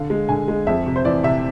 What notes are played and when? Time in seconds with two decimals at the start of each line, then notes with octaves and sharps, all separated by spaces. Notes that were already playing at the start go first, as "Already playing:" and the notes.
Already playing: D3 F5
0.10 G#3
0.29 D3 G#5
0.48 G#3
0.67 F2 E5
0.86 C3
0.96 C5
1.05 E3 D5
1.23 C3 E5